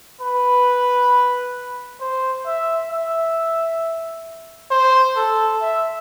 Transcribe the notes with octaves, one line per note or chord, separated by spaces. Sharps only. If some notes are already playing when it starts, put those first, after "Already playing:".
B4
C5
E5
E5
C5
A4
E5